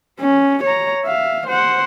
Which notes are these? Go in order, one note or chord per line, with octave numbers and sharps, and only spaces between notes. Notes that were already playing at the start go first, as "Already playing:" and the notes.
C#4
C#5 A#5
E5 F5
C5 F#5